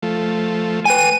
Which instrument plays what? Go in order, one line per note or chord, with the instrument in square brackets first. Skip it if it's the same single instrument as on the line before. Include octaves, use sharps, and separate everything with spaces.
[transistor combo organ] F3 A3
[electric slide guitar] B4 G5 G#5 [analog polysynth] D#7